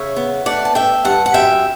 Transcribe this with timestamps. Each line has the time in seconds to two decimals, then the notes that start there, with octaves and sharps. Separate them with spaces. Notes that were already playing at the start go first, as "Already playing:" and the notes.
Already playing: C#3 C#5 E5
0.16 B3
0.46 A3 D5 F#5
0.65 A5
0.75 A3 E5 G5
1.05 G2 F#5 A5
1.26 F#5
1.34 F#2 E5 G5